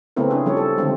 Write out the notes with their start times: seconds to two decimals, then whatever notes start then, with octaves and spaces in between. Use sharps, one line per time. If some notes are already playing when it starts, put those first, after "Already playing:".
0.17 C#3 A3 B3 C4 E4 A#4
0.30 C#4 D4 G#4
0.46 F3 G3 A4 C#5
0.57 A4
0.78 D3 D#3 G#3 A3 C4 D4